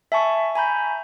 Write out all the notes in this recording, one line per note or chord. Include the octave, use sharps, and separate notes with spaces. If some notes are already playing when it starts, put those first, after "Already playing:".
E5 G#5 A5 C#6
G#5 A#5 B5 G6